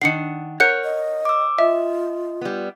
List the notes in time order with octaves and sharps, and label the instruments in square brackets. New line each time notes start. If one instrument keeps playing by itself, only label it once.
[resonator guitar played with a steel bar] D#3 D4 F#5 [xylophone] C7 C#7
[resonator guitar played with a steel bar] A#4 C#5 F#5 [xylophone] F#6 G6 C#7
[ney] D#5
[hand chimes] D6 E6
[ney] F4 [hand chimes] D#5 [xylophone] E5
[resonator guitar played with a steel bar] G3 B3